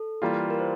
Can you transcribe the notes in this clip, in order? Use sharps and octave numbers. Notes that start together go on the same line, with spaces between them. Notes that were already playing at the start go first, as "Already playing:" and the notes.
Already playing: A4
E3 G3 A#3 F4
A#4
C5